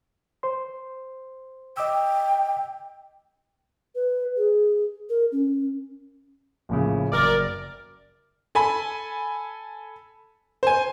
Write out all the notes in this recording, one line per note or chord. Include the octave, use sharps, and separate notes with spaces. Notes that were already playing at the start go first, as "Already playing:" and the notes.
C5 C6
D#5 G5 D6 E6
B4
G#4
A#4
C#4
A#1 A2 C#3
F#1 A#4 D5
A4 G#5 B5
C5 G#5